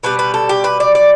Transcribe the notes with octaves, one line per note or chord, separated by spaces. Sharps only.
B2 G3 B4
B4
A4
G4
B4
D5
D5